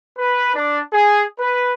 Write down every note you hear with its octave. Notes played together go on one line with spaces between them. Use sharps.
B4
D4
G#4
B4